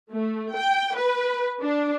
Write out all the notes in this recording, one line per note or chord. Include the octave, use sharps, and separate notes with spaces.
A3
G5
B4
D4